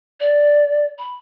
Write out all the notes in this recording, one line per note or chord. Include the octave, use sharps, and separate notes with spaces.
D5
B5